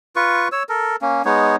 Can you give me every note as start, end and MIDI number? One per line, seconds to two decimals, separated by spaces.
0.16 0.48 65
0.16 0.48 71
0.16 0.48 85
0.52 0.63 73
0.52 0.63 88
0.69 0.96 69
0.69 0.96 70
1.02 1.22 58
1.02 1.22 61
1.25 1.56 56
1.25 1.56 59
1.25 1.56 63
1.25 1.56 73